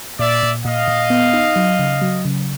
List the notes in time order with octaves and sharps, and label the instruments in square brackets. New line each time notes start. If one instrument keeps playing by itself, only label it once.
[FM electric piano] A#2 [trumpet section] D5 E5
[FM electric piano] A#2
[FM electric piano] A#2 [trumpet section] D#5 F5
[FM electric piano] A#2
B3
D#4
F#3
C#3
F#3
C#3